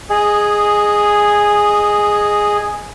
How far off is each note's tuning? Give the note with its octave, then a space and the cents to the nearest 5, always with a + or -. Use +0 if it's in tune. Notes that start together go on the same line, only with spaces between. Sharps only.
G#4 +0 D#5 -15